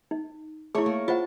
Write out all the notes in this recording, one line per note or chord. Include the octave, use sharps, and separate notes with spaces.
D#4
A3 E4 G#4 C#5
A#3
F4 C5 F#5 A5